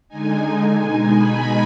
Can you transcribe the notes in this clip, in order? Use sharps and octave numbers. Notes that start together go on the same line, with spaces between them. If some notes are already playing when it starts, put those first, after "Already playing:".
D3 G#3 D#4 G#5
G#5
B2 G#3 D#4
B5